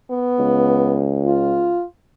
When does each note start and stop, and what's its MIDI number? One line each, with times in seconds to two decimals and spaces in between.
0.11 1.02 59
0.39 1.76 37
1.25 1.84 65